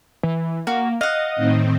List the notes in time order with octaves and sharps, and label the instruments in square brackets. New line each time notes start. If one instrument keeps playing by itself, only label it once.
[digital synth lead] E3
[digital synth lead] A#3 [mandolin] F#4
[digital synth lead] D#5 [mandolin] F5 F#5
[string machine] A2 D#3 C4